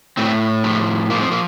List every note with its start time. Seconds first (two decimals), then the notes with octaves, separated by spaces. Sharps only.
0.17 A2 A3 C4
0.64 F3 A3
1.10 F3 A#3
1.21 C4
1.32 A#3